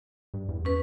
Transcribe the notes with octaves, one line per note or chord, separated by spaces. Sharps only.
G2
E2
C#4 B4